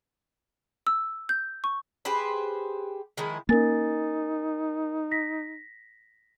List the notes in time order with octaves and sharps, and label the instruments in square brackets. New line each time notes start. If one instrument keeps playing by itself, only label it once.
[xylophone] E6
G6
C#6
[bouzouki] G4 G#4 B4 C5
D#3 F3 G#3 E4
[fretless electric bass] A#3 C#4 [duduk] D#4 [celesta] A#4 G#5 A6
[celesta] A#6 B6